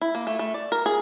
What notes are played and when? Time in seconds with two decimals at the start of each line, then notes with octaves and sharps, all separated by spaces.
0.01 E4
0.15 A#3
0.27 A3
0.39 A3
0.54 D5
0.72 A#4
0.86 G#4